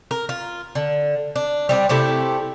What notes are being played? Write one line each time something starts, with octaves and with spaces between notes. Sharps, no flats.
A#4
F4
D3
D4
G3 C4 D4
C3 A3 E4 G4